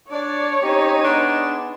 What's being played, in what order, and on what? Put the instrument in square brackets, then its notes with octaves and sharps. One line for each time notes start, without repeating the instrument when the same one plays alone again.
[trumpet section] D4 [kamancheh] C#5 [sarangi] D5
[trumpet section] C4 C#4 G4 [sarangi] D#4
[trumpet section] B3 G#4 C6 [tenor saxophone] D4